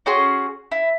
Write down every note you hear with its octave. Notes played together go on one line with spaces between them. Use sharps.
C#4 F#4 G#4 C6
E4